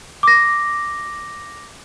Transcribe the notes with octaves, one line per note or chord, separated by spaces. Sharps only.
D6 A#6